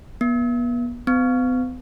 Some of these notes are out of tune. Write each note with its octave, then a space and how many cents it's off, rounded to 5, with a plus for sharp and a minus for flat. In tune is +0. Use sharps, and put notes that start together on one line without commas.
B3 -35
B3 +45